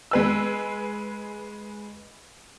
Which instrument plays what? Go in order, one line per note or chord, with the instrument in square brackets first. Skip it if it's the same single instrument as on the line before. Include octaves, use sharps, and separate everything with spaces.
[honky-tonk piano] G#3 B4 E6